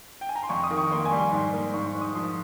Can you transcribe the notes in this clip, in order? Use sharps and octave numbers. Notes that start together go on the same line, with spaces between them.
G5
G#5
A#5
C6
F2 C#6
D#6
D#3
C#6
A#3 C6
G#5
G3
C6
G#2
A#3
G#2 C#6
C#6
G#2
D#6
F3 C6